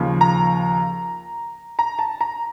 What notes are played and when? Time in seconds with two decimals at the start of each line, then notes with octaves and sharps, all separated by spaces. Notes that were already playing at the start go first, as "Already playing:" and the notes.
Already playing: D#2 C#3 F3
0.21 A#5
1.79 A#5
1.99 A5
2.21 A#5